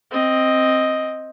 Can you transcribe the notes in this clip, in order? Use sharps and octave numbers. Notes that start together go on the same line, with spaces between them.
C4 D#5